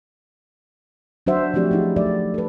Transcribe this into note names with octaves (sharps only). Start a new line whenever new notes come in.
F#3 D4 F#4 C5 E5 F#5
F3 A3 C4 F#4 G4 D5
D#4 E4 G#4
F#3 A3 A4 D5 E5
A4 B4